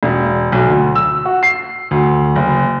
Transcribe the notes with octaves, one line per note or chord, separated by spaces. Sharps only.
E1
B1
D2
E6
F#4
C7
D2
F#1